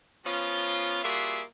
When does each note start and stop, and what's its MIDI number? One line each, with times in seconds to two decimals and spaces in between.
0.25 0.99 53
0.25 0.99 59
0.25 0.99 61
0.25 0.99 65
1.03 1.42 55
1.03 1.42 58
1.03 1.42 65
1.03 1.42 66
1.03 1.42 68
1.03 1.42 76